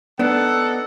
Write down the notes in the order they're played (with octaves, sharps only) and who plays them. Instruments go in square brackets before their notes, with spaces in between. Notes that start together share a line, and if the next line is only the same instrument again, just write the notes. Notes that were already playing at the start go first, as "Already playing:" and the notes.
[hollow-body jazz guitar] B3 D4 [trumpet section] D#4 A4 F#5